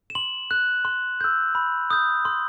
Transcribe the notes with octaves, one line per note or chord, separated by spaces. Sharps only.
E7
C6 F#7
F#6
C6
E6 G6
B5
D#6 G6
C6